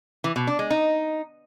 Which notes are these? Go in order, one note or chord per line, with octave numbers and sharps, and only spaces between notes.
E3
B2
D4
G#3
D#4